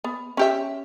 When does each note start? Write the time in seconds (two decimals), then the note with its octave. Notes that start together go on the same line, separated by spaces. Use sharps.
0.04 B3
0.37 C#4 G4 E5